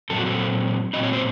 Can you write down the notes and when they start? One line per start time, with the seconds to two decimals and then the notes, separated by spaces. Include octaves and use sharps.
0.10 A#2 F#3 C4 A4
0.18 F#4
0.26 A4
0.93 A#2 F#3 C4 D#5
1.03 C#5
1.13 C5